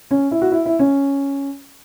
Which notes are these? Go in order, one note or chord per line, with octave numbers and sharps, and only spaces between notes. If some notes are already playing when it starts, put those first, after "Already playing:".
C#4
E4
F#4
E4
E4
C#4